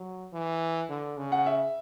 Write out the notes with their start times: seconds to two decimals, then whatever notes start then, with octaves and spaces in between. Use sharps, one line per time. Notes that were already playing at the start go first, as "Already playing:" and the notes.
Already playing: F#3
0.33 E3
0.89 D3
1.17 C#3
1.32 F#5
1.46 E5